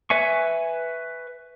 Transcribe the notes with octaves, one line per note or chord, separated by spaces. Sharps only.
B4 E5 G#5 C#6